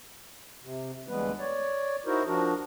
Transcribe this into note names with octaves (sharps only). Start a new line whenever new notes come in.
C3
D2 E3 G3 G#3 B3 B4
C#5 D5
D#4 E4 F#4 A#4 C5
F3 D4 F#4 A#4